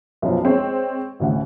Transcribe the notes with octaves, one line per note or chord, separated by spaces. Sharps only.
B1 F#2 F3
G#3 C4 C#5
A1 D2 C#4 F#5